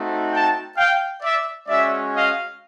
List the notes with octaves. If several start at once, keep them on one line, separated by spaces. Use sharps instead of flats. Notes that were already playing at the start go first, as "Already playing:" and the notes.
Already playing: A3 C4 D#4 F#4
G5 A5
F5 G5
D5 E5
G#3 C#4 F#4 D5 E5
D#5 F5